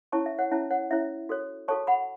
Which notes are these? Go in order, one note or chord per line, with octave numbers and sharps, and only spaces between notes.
C#4 E4 C#5 A5 C#6
E5
C#5 F#5
C#4 E4 C#5 E5 A5
C#5 F#5
C#4 E4 C#5 E5
F#4 A4 C#5
F#4 A4 C#5 A5 C#6
F#5 B5